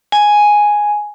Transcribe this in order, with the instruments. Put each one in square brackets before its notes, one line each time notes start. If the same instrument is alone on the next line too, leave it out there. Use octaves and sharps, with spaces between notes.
[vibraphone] G#5